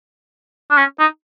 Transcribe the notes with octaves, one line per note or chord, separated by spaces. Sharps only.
D4
C#4
D#4